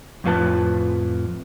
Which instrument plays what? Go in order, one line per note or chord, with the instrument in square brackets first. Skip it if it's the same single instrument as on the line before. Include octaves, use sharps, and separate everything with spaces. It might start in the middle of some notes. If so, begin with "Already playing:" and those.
[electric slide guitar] F2 A2 F3 F4 B4 A5